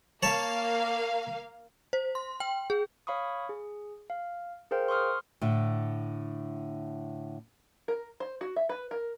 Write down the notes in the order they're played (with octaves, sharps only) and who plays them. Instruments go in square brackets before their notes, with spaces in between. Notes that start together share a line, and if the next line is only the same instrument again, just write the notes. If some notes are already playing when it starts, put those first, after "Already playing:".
[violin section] A#3 F5 [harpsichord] C#5 A5
[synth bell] C5
C6
G5
G#4
[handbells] C#5 F5 B5 C#6 D#6
G#4
F5
G#4 A#4 C5 F5 G5
C6 C#6 D#6 F6
[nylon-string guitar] A2 D3
[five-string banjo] A#4
C5
F#4
E5
B4
A#4